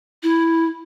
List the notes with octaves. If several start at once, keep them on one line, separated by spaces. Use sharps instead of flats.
E4